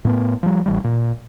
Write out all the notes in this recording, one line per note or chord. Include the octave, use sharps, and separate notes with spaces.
A2 B3
F3 G3
A1 E3 G3
A#2